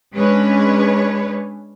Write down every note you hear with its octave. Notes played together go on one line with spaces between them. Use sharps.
G#3 C#4 D4 B4 C#5